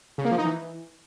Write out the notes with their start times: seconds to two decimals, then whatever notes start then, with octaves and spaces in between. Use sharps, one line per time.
0.18 C#3
0.25 A#3
0.32 F3
0.38 D#4
0.45 E3